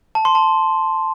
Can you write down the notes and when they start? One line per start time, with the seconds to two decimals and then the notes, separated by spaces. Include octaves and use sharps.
0.15 A5
0.25 C6
0.35 A5